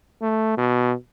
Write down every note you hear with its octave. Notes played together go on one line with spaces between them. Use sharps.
A3
B2